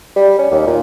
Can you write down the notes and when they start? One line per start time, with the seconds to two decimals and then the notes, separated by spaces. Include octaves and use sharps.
0.16 G3
0.39 C#4
0.51 D#2
0.67 A#2